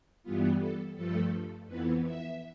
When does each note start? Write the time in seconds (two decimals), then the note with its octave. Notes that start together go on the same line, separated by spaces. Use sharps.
0.23 G2 E3 G3 B3 F4
0.59 A4
0.96 G2 F3 A3 A4
1.67 F2 E3 B3 B4
2.03 E5